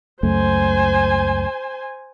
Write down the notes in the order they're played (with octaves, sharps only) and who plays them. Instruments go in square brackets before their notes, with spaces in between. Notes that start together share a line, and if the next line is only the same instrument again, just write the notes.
[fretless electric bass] C#2 F#2 A3 [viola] C5 G#5